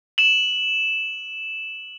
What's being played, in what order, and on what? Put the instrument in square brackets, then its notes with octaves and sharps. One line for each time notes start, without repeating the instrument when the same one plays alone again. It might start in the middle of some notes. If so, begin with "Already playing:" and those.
[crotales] E7 F#7